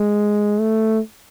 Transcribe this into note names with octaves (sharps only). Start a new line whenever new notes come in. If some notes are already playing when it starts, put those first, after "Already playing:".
Already playing: G#3
A3